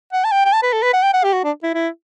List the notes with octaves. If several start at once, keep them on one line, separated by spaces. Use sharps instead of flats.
F#5
A5
G5
G5
A5
B4
A4
B4
F#5
G5
F#5
G4
F#4
D4
E4
E4